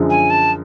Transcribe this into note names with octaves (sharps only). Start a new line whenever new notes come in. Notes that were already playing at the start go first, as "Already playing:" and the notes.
Already playing: F#2 D3 F3 G#3
G#5
A5